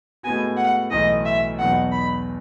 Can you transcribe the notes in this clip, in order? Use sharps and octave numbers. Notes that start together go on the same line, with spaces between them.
A2 G#3 B3 F#4 G#5
F#5
B1 A2 E3 B3 D#5
E5
E2 B2 F#3 B3 D#4 F#5
B5